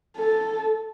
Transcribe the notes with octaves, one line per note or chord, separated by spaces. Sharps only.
A4